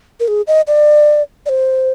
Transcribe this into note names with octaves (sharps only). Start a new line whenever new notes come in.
A#4
G#4
D#5
D5
D5
C5